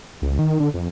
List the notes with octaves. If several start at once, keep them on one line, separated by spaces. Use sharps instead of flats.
C#2
D#3
D3
F2